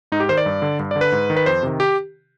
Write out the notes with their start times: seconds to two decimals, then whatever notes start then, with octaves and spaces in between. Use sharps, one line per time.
0.12 G#2 D#4
0.20 G4
0.29 D#3 C5
0.38 D5
0.46 G2
0.62 D3
0.79 G2
0.91 D3 D5
1.01 B4
1.12 G#2
1.30 D#3
1.36 B4
1.46 F2 C5
1.63 C3 D#3
1.80 G4